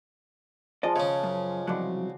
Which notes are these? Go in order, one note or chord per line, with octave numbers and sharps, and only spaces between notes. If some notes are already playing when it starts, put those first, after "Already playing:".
F3 G#3 D5 D#5 A5
C#3 C#4 C#5
F#2
C2 F3 F#3 F#4 D5 C6